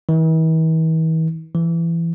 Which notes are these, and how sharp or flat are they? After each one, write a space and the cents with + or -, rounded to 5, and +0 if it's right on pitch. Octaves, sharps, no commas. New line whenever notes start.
E3 -45
E3 +20